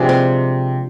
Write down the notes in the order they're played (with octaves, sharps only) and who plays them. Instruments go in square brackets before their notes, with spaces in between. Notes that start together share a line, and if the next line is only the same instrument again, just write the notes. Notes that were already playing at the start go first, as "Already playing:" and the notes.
Already playing: [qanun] C3 F3 G#3 D4
C4